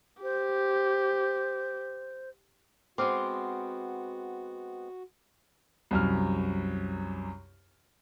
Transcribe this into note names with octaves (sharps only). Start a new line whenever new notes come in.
G4 C5
G#3 B3 C4 F#4 C6 D6 F6
C2 F#2 F6